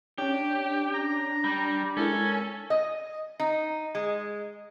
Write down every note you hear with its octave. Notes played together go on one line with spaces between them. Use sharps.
C#4 D4 G4 C#5
A#5
G3
G#3 C#4 E4 A4 A#4
D#5
D#4
G#3